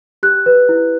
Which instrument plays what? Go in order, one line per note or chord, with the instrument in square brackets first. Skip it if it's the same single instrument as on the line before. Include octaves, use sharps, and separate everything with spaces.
[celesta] G4 F#6
B4
E4